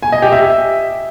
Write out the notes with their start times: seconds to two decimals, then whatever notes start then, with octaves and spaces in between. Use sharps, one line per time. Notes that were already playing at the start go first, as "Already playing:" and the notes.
0.03 G#5
0.12 D#5
0.22 G4
0.32 E5